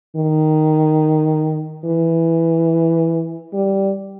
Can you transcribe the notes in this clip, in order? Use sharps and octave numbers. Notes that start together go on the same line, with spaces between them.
D#3
E3
G3